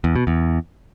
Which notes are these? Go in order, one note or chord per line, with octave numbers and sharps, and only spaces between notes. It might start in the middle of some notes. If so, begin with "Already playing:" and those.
E2
B2
E2